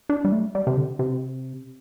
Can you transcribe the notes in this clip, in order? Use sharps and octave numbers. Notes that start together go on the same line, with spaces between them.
D4
G3
A3
G3
C3
D3
C3